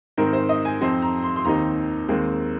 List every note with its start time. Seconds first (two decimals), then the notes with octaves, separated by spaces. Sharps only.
0.17 G#2 D#3 C4 D#4 A#4
0.33 C5
0.49 D#5
0.65 G#5
0.81 F2 F3 C4 D#4 C6
1.02 A#5
1.24 C6
1.36 C6
1.45 D#2 D#3 C4 D#4 A#5
2.09 D#2 D#3 G#3 C4